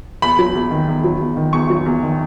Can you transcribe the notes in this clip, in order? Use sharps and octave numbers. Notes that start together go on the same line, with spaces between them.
E2 B5
F#3
E2
D#3
E2
F#3
E2
D#3
E2 C#6
F#3
E2
D#3